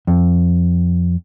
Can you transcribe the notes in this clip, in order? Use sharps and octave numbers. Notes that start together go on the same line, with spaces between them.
F2